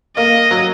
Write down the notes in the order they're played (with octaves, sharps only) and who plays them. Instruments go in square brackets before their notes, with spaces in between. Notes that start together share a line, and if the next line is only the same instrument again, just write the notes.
[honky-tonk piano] A#3 [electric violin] D#5
[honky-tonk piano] F#3